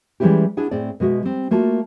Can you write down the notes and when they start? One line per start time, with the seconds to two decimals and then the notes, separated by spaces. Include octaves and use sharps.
0.20 E3 G3 G#3 C#4 E4 G4
0.57 D4 E4 G#4 F#5
0.71 A2 C4 G#4 D5
1.00 B2 G#3 F#4 E5
1.23 G3 C4
1.51 A3 A#3 F4 F#4 A5